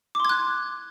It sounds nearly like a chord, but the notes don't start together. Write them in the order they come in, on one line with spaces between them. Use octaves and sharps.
D6 C6 G#6 F#6